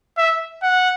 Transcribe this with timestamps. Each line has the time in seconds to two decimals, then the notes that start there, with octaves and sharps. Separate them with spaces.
0.18 E5
0.63 F#5